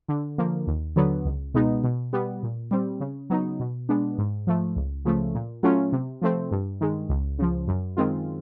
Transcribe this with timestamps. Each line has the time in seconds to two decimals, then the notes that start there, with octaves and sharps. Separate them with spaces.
0.08 D3
0.38 F3 A#3
0.67 D#2
0.96 D3 F#3 B3
1.25 C#2
1.54 B2 G#3 B3 D#4
1.84 B2
2.13 G3 B3
2.43 A#2
2.71 G3 C4
3.00 C#3
3.30 F#3 B3 D#4
3.60 B2
3.89 G#3 B3 D4
4.18 G#2
4.47 F3 A3
4.76 C#2
5.05 C#3 F3 A3
5.34 A#2
5.63 F#3 A3 C#4 F4
5.92 C3
6.22 F3 A3 C4
6.51 G2
6.81 D#3 G#3
7.09 C#2
7.39 C#3 F3
7.68 F#2
7.97 D#3 G#3 C4 F4